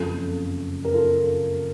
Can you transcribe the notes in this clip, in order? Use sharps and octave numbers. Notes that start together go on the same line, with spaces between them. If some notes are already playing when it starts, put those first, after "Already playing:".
Already playing: F#1 F2 C#3 F3 F4 A4
A#4
F4 A4